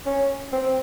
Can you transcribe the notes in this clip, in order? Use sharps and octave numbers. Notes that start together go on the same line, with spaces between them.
C#4
C4